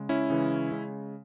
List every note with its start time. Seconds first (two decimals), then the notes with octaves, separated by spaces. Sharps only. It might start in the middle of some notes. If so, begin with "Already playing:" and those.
Already playing: C#3 G#3
0.09 C#4 E4
0.30 C#3 E3 G#3
0.71 C#3 G#3